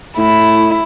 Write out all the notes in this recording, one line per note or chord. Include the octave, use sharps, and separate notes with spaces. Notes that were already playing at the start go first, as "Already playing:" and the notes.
A2 E4